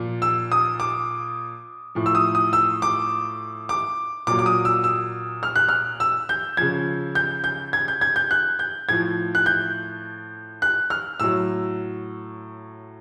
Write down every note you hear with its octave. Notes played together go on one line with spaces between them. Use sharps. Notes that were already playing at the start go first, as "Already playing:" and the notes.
Already playing: A#2 F3
E6
D#6
D6
A2 F3
E6
D#6
D#6
E6
D6
D6
A#2 F#3 D6
D6
D#6
E6
E6
F6
F#6
F6
E6
G6
C#3 F3 G#6
G6
G6
G#6
G6
G#6
G6
F#6
G6
A2 F3 G#6
F#6
G6
F#6
F6
A2 F#3 E6